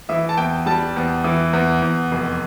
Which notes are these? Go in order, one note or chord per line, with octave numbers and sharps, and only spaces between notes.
E3 E5
A5
E2 G5
G3 A5
E2
E3
E2
E2
F1